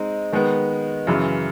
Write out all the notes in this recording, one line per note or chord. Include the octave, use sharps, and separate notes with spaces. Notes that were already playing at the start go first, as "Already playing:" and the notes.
Already playing: G#3 C4 D#4
D#3 G#3 B3
F#2 C#3 E3